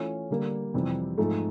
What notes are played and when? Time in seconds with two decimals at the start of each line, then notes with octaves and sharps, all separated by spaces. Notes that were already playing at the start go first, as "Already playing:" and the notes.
Already playing: E3 A3 C#4 F4
0.30 D3 G3 A#3
0.74 F2 C3 E3 G3 C4
1.18 G#2 F3 A3